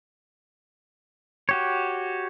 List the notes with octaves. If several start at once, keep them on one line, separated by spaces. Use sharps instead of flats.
F#4 G4 C#5